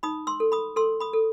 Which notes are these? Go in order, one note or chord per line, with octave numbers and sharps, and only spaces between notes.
D#4 B5 D#6
C6 E6
A4
B5 D#6
A4 C6 E6
B5 D#6
A4